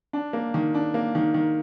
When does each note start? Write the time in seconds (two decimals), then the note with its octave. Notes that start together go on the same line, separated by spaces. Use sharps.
0.13 D4
0.33 A#3
0.54 D#3
0.74 D4
0.94 A#3
1.15 D#3
1.34 D#3